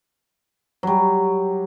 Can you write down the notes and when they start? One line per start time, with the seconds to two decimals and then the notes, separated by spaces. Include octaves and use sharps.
0.83 F#3 G3